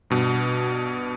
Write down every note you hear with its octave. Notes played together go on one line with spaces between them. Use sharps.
G2 B2